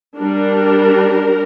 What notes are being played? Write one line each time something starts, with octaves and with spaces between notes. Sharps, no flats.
G3 D4 A#4